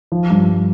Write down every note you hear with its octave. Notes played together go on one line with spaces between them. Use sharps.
F3
G2